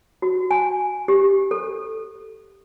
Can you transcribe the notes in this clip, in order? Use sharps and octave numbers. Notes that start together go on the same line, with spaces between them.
F#4
G#5
G4
A4